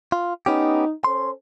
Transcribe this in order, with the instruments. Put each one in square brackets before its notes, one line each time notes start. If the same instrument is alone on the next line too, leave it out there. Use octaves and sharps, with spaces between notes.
[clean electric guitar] F4
[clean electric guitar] B3 C#4 G4 [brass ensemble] D#4
[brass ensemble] C#4 A4 C5 [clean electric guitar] C6